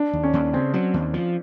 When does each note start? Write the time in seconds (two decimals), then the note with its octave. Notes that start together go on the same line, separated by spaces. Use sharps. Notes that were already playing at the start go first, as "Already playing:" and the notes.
Already playing: D4
0.13 D#2
0.23 C#4
0.33 D#2
0.53 C#3 C4
0.74 F#3
0.94 D#2
1.14 F3